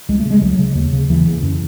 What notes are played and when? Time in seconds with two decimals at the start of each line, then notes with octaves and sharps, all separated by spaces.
0.09 C#2 G#3
0.20 A3
0.25 C#3
0.31 G#3
0.41 C#2 F#3
0.59 C#3
0.75 D#2
0.92 C#3
1.10 D#2 E3
1.26 C#3
1.43 F#2